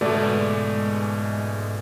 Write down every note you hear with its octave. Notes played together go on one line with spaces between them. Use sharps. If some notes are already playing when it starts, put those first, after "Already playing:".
G#2 B2 G#3 A3 B3 D5